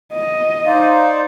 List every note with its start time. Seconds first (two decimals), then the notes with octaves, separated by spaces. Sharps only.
0.12 D#5
0.66 D#4 C5 D5 F5